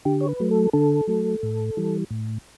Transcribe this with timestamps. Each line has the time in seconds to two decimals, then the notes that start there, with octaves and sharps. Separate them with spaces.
0.05 D3 G4
0.21 C#5
0.28 B4
0.40 F#3 A3
0.51 A4
0.73 D3 A4
1.07 F#3 A3
1.43 A2
1.77 E3 G3
2.11 A2